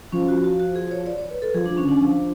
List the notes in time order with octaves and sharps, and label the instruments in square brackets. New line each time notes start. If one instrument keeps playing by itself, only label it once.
[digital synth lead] F3 [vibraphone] C#4
[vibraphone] F#4
F#4
F#4
G#4
C#5
D5
C#5
B4
A4
[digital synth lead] F3 [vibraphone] G#4
[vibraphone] D4
[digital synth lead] F3
[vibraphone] C#4
[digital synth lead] D3 [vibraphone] D4
[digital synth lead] F3